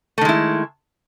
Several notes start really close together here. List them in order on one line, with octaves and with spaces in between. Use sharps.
A3 D#3 G#3 E4